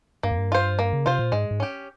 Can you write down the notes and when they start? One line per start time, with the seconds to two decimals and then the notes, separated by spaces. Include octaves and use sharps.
0.23 G2 A#3
0.31 F2
0.38 G2
0.52 F4 C5
0.79 A#3
0.93 C#3
1.06 C3 F4 C5
1.19 A#2
1.32 G#2 G#3
1.51 G#2
1.60 C#4 G4